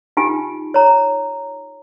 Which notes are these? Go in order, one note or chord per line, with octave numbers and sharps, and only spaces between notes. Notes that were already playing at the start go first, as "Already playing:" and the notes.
D#4 F4 G4 G#5
C#5 A#5